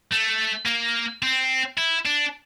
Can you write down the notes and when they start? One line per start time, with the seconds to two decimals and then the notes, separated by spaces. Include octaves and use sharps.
0.11 A3
0.66 A#3
1.23 C4
1.77 E4
2.05 D4